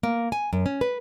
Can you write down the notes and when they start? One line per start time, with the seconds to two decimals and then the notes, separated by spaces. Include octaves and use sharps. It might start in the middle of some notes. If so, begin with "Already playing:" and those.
0.03 A#3
0.32 G#5
0.53 F#2
0.66 C#4
0.81 B4